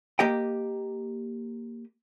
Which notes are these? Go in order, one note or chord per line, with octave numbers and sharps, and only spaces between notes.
A#3 G4 D#5 G5